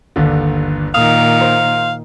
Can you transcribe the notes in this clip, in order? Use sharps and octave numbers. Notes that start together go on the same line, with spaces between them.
G1 D#2 D3
A#2 D#3 F5 D#6
C5